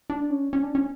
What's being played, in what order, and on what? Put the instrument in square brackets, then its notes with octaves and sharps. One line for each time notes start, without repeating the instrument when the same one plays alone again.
[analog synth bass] D4
C#4
C#4
D4
C#4